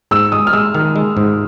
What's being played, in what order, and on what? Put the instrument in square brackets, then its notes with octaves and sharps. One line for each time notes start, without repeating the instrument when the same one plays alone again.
[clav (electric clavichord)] G#2 [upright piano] E6
[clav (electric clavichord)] G#3 [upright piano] D#6
[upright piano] F6
[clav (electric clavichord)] G#3 [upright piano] E6
[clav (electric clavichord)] D#3 [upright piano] F6
[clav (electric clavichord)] G#3
G#2